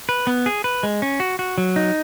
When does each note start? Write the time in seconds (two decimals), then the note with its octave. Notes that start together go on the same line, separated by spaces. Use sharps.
0.09 B4
0.27 B3
0.46 G#4
0.64 B4
0.83 G#3
1.02 C#4
1.20 F#4
1.39 F#4
1.58 F#3
1.76 D#4